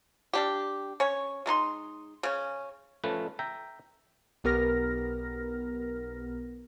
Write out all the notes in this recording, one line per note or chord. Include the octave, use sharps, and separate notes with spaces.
G3 D4 G4
C#4 C#5
G#3 A3 D#4 C6
C#3 C#4
F3 A3 C#4 B4
E5 G5 A#5
B1 B3 G4 A#4 F6 A#6